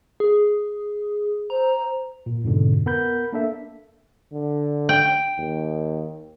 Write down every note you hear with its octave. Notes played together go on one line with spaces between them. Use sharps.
G#4
C5 A#5
A#2
F2 G#2 B2 D3
B3 A#4 B5 G6
A#3 D4 A4 E5
D3
G5
D#2